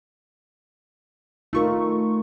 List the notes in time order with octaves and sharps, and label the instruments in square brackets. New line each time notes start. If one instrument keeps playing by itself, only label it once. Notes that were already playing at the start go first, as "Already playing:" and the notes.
[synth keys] A3 C#6 [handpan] D#4 F4 A#4